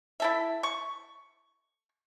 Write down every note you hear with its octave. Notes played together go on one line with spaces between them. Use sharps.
E4 A4 E5
C#6